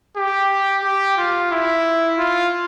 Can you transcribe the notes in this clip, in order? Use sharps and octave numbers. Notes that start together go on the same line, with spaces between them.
G4
G4
F4
E4
F4